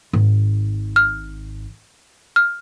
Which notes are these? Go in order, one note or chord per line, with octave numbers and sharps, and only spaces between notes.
G#1
F6
F6